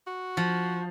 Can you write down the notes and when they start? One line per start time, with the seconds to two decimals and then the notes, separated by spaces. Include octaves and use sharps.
0.07 F#4
0.37 F3